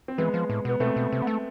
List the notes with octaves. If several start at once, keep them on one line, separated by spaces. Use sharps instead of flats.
C4
E3 G#3 B3
F3
A2
B2 B3
B2 A3 C4
B2
C3
B3
A3